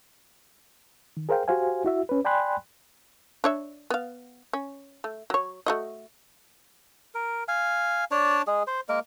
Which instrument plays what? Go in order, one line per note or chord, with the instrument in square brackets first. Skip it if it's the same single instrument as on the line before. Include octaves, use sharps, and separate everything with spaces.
[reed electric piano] D#3
G#4 A#4 C5 F5 G5
F#4 G4 C5 F5 G#5
E4 F#4 E5
C#4 B4
D5 G5 G#5 B5 C6 F#6
[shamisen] D4 C#5 E5
B3 F5
C#4
A3
F#3 C#5
A3 F#4 D#5
[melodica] A#4
F5 G#5
D4 C#5 D5 A5
G#3 G#4
C5
G#3 A#3 A#4